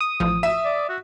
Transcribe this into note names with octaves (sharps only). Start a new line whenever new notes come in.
D#6
A1 F3
E5 E7
D5
F#4